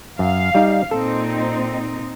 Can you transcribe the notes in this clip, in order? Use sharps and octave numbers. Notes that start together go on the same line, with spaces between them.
F#2 F5
G3 D#4 D5
A#2 C4 D#4 A4